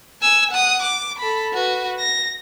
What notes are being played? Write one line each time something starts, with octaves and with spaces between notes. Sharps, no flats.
G#5 E6
F#5 D#6
D6
A4 B5
F#4 B4
A#6